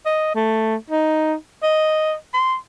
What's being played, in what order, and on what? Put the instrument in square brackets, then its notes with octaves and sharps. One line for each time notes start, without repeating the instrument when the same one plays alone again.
[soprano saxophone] D#5
A3
D#4
D#5
C6